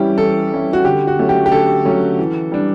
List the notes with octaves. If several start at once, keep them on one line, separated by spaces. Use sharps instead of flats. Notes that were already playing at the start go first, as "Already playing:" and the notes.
Already playing: E3 G3 C#4 E4 G4
E3 A4
G3 C#4 E4
F#4
D3 G4
F#4
F#3 A3 C#4
G4
G4
D3 A4
F#3 A3 C#4
E3
G3 D4